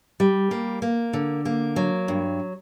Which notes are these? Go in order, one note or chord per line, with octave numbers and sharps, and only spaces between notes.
G3
A#3
A#3
D3
A#3
F#3
G2